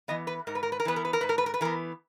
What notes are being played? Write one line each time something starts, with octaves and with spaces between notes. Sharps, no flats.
E3 B3 D#5
B4
G#2 A#4
B4
A#4
B4
A#4
E3 B3 B4
A#4
B4
A#4
G#2 B4
A#4
B4
A#4
B4
E3 B3 A#4